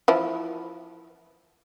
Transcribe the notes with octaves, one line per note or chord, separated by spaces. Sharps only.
E3 F3 E4